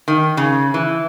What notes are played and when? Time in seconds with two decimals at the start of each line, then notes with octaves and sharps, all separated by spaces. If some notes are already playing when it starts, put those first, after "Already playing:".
0.08 D#3
0.37 C#3
0.74 E3